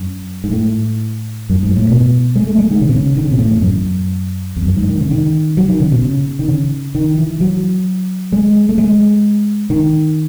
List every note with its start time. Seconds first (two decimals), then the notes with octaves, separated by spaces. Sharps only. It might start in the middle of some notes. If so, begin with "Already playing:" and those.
Already playing: F#2
0.44 G#2
0.52 A2
1.50 F#2
1.63 G#2
1.76 A2
1.90 B2
2.36 G#3
2.47 A3
2.58 G#3
2.70 D#3
2.81 C#3
2.89 B2
2.96 C#3
3.17 D#3
3.25 C#3
3.31 B2
3.39 A2
3.51 E2
3.62 F#2
4.56 E2
4.65 F#2
4.76 G#2
4.88 D#3
5.00 C#3
5.11 D#3
5.57 F#3
5.68 D#3
5.80 C#3
5.92 B2
6.03 C#3
6.39 D#3
6.48 C#3
6.95 D#3
7.18 E3
7.41 F#3
8.32 G#3
8.69 A3
8.78 G#3
9.70 D#3